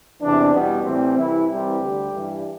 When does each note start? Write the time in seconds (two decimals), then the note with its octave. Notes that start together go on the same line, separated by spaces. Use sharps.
0.21 E2 C3 E3 D4
0.52 E2 B2 G3 B3
0.84 A2 E3 G3 C4
1.16 C2 C3 E3 E4
1.48 C2 C3 E3 G3 G4
1.79 D2 D3 G3
2.11 G2 E3 G3